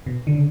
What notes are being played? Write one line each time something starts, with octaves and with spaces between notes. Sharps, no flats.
B2
D3
C#3